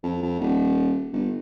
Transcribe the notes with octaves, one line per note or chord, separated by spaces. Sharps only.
F2
F2
D#1
G1